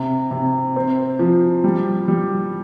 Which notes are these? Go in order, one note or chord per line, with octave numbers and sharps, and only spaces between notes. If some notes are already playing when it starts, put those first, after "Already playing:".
Already playing: C3
C3
C4
F3
G3
G3